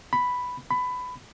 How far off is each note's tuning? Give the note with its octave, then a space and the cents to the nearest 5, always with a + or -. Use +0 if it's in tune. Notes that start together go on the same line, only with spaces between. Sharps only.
B5 +5
B5 +20